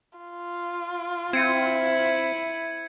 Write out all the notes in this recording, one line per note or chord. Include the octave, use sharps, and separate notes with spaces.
F4
C4 E4 G#6 C#7 D#7